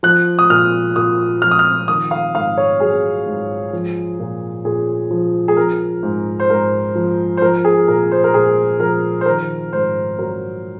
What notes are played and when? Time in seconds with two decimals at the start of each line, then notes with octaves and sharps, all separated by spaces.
0.03 F3 F#6
0.39 D#6
0.50 A#2 F6
0.96 A#2 D#6
1.42 F3 F6
1.51 D#6
1.59 F6
1.88 D#3 D#6
2.11 F5
2.34 G#2 F5
2.57 C#5
2.80 F#3 G#4
3.26 G#2
3.73 F3
4.19 A#2
4.65 A#2 G#4
5.11 F3
5.48 G#4
5.57 F3 A#4
6.03 G#2
6.40 C5
6.49 G#2 A#4
6.95 F3
7.37 C5
7.42 F3 A#4
7.65 G#4
7.88 A#2 A#4
8.11 C5
8.24 A#4
8.34 A#2 G#4
8.80 F3 A#4
9.21 C5
9.26 D#3 A#4
9.72 G#2 C5
10.19 F#3 A#4